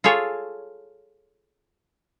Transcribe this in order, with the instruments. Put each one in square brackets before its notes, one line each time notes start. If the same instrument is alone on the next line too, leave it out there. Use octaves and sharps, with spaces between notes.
[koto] F4 G#4 A4 C#5